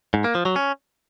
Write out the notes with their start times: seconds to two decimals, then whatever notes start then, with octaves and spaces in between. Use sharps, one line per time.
0.14 G#2
0.24 A#3
0.35 F3
0.45 F#3
0.56 C#4